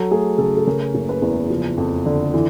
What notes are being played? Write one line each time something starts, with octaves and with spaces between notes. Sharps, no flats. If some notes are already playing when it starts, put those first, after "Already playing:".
Already playing: F#3 A4
A3 G#4
C#3 A4
A4
C#3 A#4
F#1
B4
E2
F3
F2
D3
E3